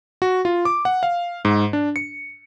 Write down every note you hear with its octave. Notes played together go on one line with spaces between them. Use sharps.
F#4
F4
D6
F#5
F5
G#2
D4
C#7